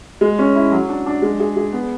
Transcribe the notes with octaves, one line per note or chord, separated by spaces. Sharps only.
G#3
C#4
E4
F#3
D4
D4
G#3
G#4
G#4
B3